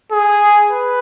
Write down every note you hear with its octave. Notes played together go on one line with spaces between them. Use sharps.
G#4
B4